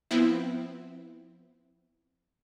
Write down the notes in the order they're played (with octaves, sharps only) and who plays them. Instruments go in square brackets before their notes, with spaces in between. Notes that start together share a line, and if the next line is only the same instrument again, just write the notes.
[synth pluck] F3 B3 C4 E4